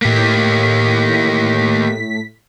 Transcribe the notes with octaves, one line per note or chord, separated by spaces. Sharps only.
A2 A#3 G4 B6